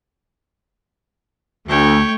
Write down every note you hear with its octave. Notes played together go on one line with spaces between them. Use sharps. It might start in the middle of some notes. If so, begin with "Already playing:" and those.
D2 A3 C#5 G5